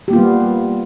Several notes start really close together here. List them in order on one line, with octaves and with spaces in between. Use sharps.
G4 A#3 F4 B3 G3